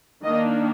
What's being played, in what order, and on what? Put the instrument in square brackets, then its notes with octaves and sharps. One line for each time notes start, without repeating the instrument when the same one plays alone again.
[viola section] D#3 A#3 D4 D#5